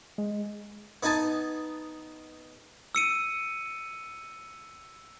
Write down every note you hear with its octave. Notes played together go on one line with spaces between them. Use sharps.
G#3
B3 D#4 G#5 A5
E6 C#7 D#7